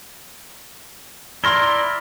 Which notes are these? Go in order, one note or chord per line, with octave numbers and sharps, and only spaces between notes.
E4 D5 A#5 C6 F6 G7